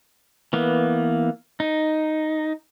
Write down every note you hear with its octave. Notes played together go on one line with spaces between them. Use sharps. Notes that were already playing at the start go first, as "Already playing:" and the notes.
E3 A#3 B3
D#4